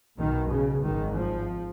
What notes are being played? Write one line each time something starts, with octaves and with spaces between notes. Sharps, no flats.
B1 B2 D#3
C#3
G#1 G#2 D#3
F3